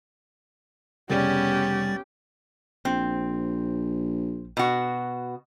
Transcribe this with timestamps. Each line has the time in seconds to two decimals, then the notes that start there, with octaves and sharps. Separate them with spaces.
1.10 F1 C#3 G3 B3 C#4 G4 D5 A6
2.85 A#1 C4
4.57 B2 F#4